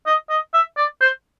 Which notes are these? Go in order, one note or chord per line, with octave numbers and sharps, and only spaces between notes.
D#5
D#5
E5
D5
C5